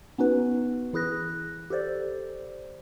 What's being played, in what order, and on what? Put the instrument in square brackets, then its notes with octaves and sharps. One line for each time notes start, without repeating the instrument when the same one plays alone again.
[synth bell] B3 C#4 D#4 F#4 B4
E3 E4 G#4 F#6 A#6
G4 A4 C5 D5